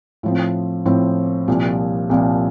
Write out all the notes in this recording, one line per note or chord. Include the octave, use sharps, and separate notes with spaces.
A2 F3 C4
A2 F3 C4
C2 A#2 F3
C2 A#2 F3